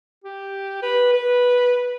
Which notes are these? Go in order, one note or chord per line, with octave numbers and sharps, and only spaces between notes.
G4
B4
B4